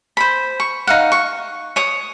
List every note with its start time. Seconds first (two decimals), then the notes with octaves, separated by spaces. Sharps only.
0.17 C5 B5
0.60 C#6
0.87 D#4 F5 F#5
1.12 C#6
1.76 C#5 D#6